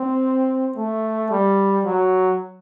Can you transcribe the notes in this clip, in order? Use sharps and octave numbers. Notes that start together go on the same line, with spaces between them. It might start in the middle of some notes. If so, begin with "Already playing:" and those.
Already playing: C4
A3
G3
F#3